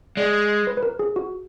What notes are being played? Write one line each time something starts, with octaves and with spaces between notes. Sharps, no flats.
G#3 D5
B4
B4
A#4
G#4
F#4